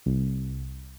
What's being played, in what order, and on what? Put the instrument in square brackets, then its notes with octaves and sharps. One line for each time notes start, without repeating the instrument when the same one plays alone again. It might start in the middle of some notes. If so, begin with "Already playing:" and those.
[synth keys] C2